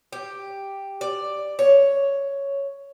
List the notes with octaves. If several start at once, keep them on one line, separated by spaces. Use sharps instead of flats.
G4
D5
C#5